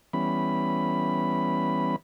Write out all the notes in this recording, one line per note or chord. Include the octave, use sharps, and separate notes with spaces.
E3 G3 B3 C#4 B5